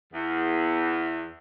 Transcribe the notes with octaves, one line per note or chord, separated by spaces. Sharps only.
E2